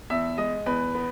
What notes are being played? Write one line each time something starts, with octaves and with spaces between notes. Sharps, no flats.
E2 E5
G#3 D#5
E2 B4
B3